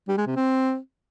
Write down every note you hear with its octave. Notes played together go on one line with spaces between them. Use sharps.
G3
G#3
C3
C4